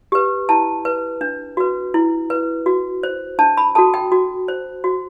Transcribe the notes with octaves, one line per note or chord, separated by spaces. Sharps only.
G4 B4
E4 A5
B4
D4
F#4 B4
E4
B4
F#4
C5
D4 A5
B5
F#4 A4 A5
G5
F#4
C5
F#4